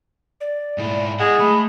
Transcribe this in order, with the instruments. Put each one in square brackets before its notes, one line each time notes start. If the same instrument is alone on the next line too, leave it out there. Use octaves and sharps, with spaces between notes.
[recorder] D5
[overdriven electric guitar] G#2 E4
[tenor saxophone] G#3 [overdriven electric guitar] E4 F#5
[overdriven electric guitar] A3 [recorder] B5